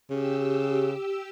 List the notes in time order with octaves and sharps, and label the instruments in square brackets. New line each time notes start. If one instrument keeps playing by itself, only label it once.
[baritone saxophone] C#3 [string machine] G4 E6